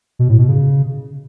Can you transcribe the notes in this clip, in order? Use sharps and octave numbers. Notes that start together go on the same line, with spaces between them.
B2
A2
B2
C#3